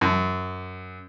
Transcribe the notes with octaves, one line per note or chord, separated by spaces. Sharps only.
F#2